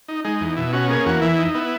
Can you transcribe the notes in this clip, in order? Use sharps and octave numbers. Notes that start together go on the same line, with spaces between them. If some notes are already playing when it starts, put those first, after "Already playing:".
D#4
G#3 D#4
E2
B2 E4
C#4 F#4
A#3 G#4
E2 F#4
E3 E4
D#4
B3 E4